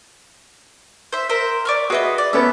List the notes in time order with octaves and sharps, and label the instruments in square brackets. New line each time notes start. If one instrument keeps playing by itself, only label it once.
[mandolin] C5 E5
A#4 C5 E5
D5 C#6 F6
[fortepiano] F#4 E5 [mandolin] G#4 B4 D#5
[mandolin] D5
[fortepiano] B3 C#4 A4 [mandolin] E5